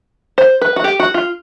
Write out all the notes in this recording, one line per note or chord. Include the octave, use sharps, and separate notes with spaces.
C5
B4
F#4
G4
F#4
F4